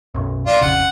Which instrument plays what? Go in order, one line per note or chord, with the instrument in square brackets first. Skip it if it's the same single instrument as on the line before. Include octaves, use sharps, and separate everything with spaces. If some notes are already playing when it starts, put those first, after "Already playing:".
[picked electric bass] B1 F#2
[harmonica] D4 F4
[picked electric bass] F1 A#1 C#3 [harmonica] F#5